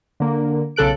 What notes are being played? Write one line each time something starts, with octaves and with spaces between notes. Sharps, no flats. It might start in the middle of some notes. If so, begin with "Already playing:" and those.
D3 A#3
B1 C#3 A4 F#6 D7